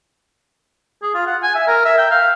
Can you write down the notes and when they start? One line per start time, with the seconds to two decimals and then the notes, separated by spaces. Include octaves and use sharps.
1.03 G#4
1.15 F4
1.26 F#5
1.43 G#5
1.55 E5
1.68 A#4
1.85 E5
1.98 G5
2.11 F5